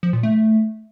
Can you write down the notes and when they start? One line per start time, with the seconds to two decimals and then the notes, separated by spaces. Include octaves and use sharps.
0.03 F3
0.13 A#2
0.23 A3